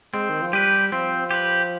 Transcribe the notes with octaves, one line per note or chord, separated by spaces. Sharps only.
G#3 C4
D#3
F3
G3 G4 B4
F3 C4
G4 B4